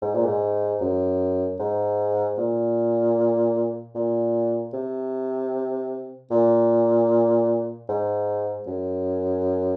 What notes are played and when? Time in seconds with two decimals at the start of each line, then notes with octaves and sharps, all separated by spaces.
0.02 G#2
0.14 A#2
0.26 G#2
0.81 F#2
1.60 G#2
2.38 A#2
3.95 A#2
4.73 C3
6.30 A#2
7.89 G#2
8.67 F#2